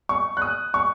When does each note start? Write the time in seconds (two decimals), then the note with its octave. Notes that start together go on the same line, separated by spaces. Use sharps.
0.09 C#6
0.37 F#6
0.42 D#6
0.74 C#6